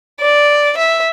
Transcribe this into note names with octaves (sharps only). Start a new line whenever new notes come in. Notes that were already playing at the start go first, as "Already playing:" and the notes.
D5
E5